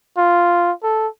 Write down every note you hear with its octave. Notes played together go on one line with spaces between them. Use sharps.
F4
A4